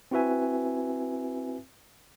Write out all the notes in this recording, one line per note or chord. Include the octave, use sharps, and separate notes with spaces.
C4 E4 F#4 B4 E5 G#5